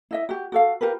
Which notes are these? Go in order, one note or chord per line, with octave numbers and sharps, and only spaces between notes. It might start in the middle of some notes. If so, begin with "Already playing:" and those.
E4 D#5 E5
F#4 G4
F#4 A4 F5
F4 G4 A#4 B4